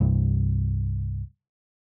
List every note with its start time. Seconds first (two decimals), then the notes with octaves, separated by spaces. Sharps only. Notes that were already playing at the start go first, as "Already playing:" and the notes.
0.01 C2 G2